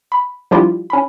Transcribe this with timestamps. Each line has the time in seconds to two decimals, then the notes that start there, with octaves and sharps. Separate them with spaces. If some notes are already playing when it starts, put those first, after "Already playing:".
0.12 B5
0.51 F3 G3 D4 E4 F4 G4
0.90 C#4 B5